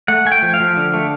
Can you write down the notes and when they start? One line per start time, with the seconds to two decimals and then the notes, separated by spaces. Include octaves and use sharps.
0.08 A3 F#5
0.25 A3 G#5
0.32 G5
0.43 F3
0.54 F5
0.60 F3
0.77 D3
0.94 A3